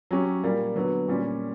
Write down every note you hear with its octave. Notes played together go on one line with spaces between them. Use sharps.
F#3 C#4 G4
A#2 G3 A#3
D3 F#3 B3
A#2 G3 C#4 G4